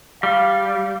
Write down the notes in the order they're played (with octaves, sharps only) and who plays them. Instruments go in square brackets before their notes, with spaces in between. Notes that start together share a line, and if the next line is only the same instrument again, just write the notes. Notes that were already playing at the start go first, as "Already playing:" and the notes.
[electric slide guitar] G3 [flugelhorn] F5